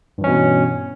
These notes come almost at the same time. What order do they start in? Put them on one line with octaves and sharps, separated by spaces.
G2 E3 C#4 B2